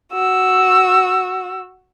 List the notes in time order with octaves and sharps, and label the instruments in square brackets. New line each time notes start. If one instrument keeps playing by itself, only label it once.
[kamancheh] F#4 E6